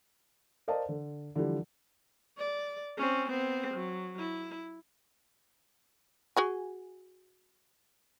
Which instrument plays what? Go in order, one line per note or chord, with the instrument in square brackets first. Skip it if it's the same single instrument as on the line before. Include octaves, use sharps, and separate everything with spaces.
[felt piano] A#4 C5 D5 D#5 F5 A5
D3
D3 E3 F3 G3
[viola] D5
C4 C#4
B3 C4
F#3
E4
[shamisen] F#4 G#4 G#5